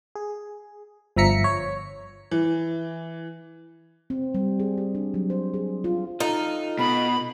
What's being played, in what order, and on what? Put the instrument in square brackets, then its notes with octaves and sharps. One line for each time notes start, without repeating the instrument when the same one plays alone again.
[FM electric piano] G#4
G1 F3 E5 A#5 B6 C#7
C#5
[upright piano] E3
[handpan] C4
G3
G#4
G4
D4
F#3
C5
G#4
F4
[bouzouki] D#4 [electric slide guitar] F4 A4 F5
[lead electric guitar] B2 [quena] B5